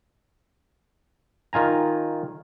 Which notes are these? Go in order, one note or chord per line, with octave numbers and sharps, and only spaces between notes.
D#3 F4 G#5 A#5